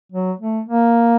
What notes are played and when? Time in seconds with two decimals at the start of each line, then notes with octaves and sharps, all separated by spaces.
0.12 F#3
0.40 A3
0.68 A#3